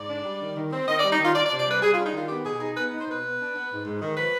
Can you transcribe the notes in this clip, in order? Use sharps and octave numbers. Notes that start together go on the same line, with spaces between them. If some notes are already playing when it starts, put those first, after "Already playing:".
Already playing: G#2 D5
D4
G3
D#3
D#3
C4
D#3 D#5
D5
G3
D#4
D#3 F4
D4 D5
D5
C3
D5
G3 B4
G3 G#4
F4
D4
D#4
D#3 F4
B3 G4
B2 G#4
D#4 G#4
B3 B4
D#4
C5
B2 B4
B3
D4
B3
G#2
G#2
D#3
F3 B4